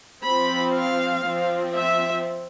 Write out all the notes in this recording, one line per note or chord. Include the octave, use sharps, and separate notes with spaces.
F3 C4 B5
F5
F3 C4
E5